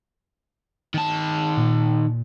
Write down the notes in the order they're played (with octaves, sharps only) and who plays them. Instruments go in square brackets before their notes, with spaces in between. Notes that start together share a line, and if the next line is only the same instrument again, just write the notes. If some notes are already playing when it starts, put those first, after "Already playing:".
[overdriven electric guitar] D#3 A5
[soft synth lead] A#2